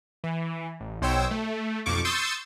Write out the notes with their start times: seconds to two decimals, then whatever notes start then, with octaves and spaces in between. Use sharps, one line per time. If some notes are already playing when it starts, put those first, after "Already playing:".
0.24 E3
0.80 A1
1.01 B1 B2 C5 C#5 G5 E6
1.31 A3
1.86 B1 F2 F3 C#6 D6
2.05 C6 C#6 D#6 E6 G6 A6